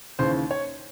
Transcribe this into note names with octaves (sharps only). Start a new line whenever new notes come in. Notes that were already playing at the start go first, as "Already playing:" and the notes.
D#2 C#3 E3 C5
C#5